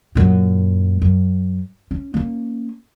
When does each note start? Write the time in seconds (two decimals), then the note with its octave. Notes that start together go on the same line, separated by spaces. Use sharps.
0.15 F#2 A#2
1.02 F#2
1.91 C#4
2.14 A#3 C#4